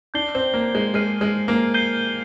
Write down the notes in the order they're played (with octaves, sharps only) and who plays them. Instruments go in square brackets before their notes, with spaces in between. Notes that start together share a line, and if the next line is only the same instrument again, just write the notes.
[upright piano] D4 [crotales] G6 C7 G7
[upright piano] C4
A#3
G#3
[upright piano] G#3 [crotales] F6 C7 D#7 G7
[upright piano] G#3
A#3
[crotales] G6 C7 D#7 G7